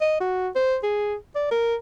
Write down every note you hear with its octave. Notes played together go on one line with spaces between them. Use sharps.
D#5
F#4
C5
G#4
D5
A#4